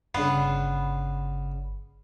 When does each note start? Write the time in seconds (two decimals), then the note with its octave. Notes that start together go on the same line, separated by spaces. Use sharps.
0.14 G1 C#3 B3 D4 C6